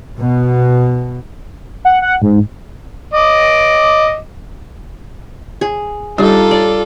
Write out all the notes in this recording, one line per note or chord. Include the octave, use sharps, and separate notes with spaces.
B2
F#5
F#5
G#2
D#5 D6
G#4
G3 D4 D#4 F4 G4 A4
D5